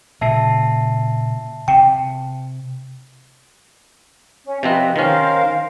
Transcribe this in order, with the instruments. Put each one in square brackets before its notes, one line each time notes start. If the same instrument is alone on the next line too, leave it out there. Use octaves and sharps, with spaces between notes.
[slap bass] A#2 C#3 [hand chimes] E5 A5 C7
[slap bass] C3 [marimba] G5
[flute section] C#4
[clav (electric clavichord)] C3 F3 C4 [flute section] B4 D#5
[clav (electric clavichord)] D#3 C#4 [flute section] A#4 C5 F5